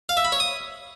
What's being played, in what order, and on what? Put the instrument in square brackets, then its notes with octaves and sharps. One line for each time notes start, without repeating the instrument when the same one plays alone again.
[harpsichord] F5
E5
B5
C#5
D#6